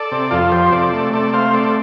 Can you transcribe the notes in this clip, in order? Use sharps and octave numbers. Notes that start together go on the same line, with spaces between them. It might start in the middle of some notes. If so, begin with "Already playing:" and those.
Already playing: A4 D5
C3
F2 F4 A4
F3 G4 C5
C3 A4 D5
A3
C3 A4 D5
A3 C5 F5
C4 A4 D5